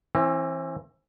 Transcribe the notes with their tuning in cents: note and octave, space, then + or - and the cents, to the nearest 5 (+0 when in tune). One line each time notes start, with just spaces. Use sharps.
E3 +0 C4 +35